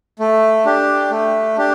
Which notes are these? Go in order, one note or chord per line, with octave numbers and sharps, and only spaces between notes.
A3
D4 G4
A3
D4 G4